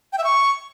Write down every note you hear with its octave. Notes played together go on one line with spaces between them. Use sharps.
G5
E5
C#6